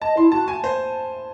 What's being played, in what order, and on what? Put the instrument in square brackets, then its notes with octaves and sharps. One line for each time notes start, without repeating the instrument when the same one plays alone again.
[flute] D#5 [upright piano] A5
[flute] E4 [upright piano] C6
[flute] F#4 [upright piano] A5
[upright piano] G#5
C5